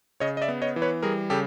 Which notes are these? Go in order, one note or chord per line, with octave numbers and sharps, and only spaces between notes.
C#3 C#5 D#5
D#5
D5 E5
B3
C#5 D#5
E3
B4 C#5
G3 G#4 A#4
C#3 G4 A4